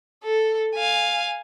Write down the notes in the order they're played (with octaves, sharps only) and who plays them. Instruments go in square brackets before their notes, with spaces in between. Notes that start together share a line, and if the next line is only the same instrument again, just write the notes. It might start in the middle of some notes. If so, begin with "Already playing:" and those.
[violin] A4
F5 G#5